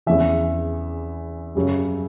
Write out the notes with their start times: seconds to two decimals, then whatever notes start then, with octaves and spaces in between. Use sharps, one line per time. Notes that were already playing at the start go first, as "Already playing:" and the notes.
0.06 E2 C#3 E3 E5
1.55 F#2 C#3 G3